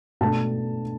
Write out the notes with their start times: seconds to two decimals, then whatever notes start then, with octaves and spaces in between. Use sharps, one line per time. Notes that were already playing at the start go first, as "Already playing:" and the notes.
0.21 B2 A3 D4 A5